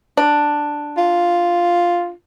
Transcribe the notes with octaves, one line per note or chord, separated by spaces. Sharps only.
D4
F4